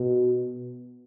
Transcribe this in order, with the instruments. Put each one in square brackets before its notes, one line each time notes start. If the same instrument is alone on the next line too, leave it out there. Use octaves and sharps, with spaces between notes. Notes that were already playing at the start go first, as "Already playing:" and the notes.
Already playing: [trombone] B2